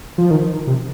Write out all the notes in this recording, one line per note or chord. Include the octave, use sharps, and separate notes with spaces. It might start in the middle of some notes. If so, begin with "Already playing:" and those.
F3
D#3
C3